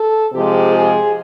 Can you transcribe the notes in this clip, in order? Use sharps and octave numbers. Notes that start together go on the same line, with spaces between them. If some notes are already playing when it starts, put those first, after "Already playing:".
Already playing: A4
C3 F3 G#3 G4
G#4